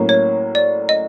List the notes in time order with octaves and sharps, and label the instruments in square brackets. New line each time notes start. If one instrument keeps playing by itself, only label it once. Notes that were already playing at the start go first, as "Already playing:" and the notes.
Already playing: [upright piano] A2 F#3 A#3 C#4
[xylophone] C#5
D5
D#5